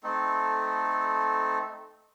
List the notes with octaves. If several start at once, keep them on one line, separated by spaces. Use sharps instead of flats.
A3 C4 D#4 A4